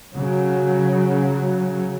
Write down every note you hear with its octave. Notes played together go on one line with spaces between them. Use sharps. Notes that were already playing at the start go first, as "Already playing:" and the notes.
C#3 F#3